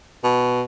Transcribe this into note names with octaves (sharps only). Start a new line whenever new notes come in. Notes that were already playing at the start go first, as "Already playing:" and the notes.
B2